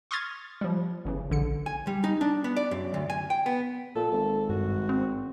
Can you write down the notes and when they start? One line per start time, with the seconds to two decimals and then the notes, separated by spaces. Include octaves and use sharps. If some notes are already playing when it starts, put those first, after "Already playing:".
0.11 C6 C#6 D#6 F6 G#6 A6
0.61 F3 G3
1.05 G1 C#3 E3
1.30 A#1 D3 C#7
1.66 G#5
1.87 G3
2.04 D#4
2.21 D4
2.44 B3
2.57 D5
2.71 F#2
2.94 D2
3.10 G#5
3.30 G5
3.46 B3
3.95 A#2 A4
4.11 G#1 A4
4.49 G2 F#4
4.89 C4